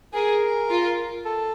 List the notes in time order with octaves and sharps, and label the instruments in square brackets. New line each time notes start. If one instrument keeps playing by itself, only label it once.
[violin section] G#4 [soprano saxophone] A#4
[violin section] F4
[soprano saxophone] A4